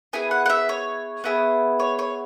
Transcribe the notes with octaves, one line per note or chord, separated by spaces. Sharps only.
B3 E4 G#4 G#5
F#5
F#5
E5
C#5
B3 E4 G#4
C#5
C#5